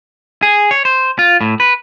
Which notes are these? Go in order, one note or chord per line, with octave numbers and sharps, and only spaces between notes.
G#4
C#5
C5
F4
A2
B4